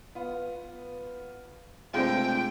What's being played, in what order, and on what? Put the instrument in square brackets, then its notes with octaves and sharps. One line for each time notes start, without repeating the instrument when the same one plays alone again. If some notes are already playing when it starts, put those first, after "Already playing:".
[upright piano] B3 F4
[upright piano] C3 G#3 A3 [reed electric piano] C4 D4 F4 [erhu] G5